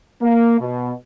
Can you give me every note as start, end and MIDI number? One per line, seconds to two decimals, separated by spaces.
0.22 0.56 58
0.60 0.93 47